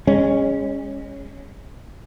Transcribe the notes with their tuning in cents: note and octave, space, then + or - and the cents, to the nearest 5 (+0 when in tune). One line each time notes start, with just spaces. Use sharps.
G#3 -30 C#4 +0